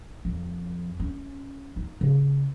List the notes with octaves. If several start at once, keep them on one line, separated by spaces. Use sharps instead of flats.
F2
C#4
D#4
C#3